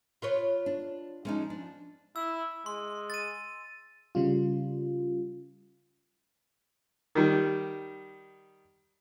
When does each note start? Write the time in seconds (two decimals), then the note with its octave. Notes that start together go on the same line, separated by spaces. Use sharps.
0.22 F4 B4 C#5
0.66 D4
1.25 F3 G#3 C#4 D#4
1.50 D4
2.16 E4 E6
2.66 G#3 C6
3.10 A6 D#7
4.15 C#3 G3 F4
7.15 D#3 G3